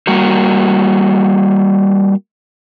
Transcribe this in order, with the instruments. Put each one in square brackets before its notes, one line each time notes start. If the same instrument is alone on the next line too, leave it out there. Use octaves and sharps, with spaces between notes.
[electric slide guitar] G3 A#3 F#4 A#4